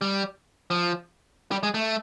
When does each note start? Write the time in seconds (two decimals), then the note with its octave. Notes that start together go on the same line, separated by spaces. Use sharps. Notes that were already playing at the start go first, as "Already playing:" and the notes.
0.01 G3
0.70 F3
1.51 G3
1.63 G#3
1.74 A3